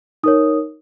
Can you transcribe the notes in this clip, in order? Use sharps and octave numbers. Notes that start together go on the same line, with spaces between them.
D#4 A#4 C#5 D#6